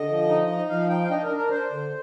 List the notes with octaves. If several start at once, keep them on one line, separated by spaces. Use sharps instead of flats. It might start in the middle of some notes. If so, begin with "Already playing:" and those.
Already playing: D3 D#5
F3
D#4
D#4
F3 F5
D#4 G5
F5
D4 D#5
A#4
D4
A#4
D4 C5
D3